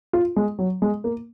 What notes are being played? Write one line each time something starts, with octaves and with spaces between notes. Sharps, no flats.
F4
G#3
F#3
G#3
A#3